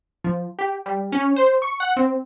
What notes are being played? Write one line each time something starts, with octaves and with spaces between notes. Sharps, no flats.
F3
G4
G3
C#4
C5
C#6
F#5
C4